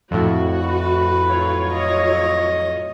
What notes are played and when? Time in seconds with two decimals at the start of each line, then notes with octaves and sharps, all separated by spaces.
0.11 F2 A2 F#4
0.63 B4
1.28 F#3 F4 C#5
1.72 D#5